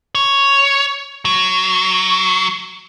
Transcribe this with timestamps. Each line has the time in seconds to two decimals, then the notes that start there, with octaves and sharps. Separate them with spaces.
0.15 C#5
1.25 F#3